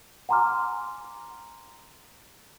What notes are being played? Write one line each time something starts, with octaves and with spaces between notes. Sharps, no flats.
F#5 G#5 A#5 C6 D6 F6